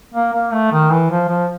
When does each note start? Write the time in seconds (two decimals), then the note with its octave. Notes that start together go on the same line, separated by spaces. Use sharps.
0.14 A#3
0.33 A#3
0.52 A3
0.72 D#3
0.91 E3
1.10 F3
1.28 F3